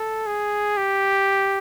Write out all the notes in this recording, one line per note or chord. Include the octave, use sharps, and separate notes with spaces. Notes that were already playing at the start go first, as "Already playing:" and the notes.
Already playing: A4
G#4
G4